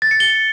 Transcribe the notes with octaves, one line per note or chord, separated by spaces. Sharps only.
A6
C#7
G7